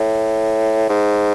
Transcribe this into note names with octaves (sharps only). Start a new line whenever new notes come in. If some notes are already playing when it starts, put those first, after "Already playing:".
Already playing: A2
G#2